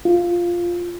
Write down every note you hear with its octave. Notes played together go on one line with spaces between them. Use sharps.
F4